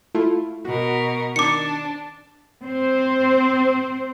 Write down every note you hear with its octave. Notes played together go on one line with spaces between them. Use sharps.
A3 E4 F4
B2 F#4 A#4
D#3 D4 D6 C#7
C4 C5